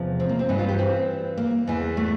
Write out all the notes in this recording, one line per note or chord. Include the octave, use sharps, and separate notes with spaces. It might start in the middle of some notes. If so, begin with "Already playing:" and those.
Already playing: E2 C3 F3
C4
A#3
C4
G2 E3 D4
F4
G4
C4
A#3
E2 E3
A3